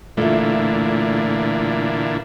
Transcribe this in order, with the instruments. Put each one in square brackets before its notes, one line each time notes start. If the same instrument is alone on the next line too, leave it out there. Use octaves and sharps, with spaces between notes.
[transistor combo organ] A#2 D3 E3 [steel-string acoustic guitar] A3 F4